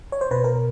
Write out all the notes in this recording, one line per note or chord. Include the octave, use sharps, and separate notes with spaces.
C#5
C5
B2 B4
A#4